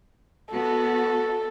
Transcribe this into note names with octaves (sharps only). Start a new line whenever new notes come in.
B3 F#4 A4